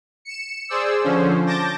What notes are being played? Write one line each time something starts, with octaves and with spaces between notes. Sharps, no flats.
C#7 E7
G#4 C5 D5 E6
D3 F3 C#4 C5
A5 D6 G6 A6 A#6